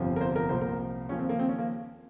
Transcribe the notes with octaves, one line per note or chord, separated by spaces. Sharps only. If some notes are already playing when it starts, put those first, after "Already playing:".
Already playing: G1 F2 C3 F3
A#4
C5
A#4
C2 A#2 F3 C5
A#4
D#2 C#3 F3 C#4
C4
A#3
C4
C#4
A#3